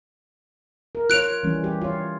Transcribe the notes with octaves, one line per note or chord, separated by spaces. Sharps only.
A#4
F4 C#5 F#6 D7 F7
E3 G3 C#4
G4
F4 C#5